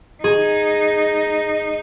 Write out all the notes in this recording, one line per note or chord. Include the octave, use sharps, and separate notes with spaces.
D#4 G#4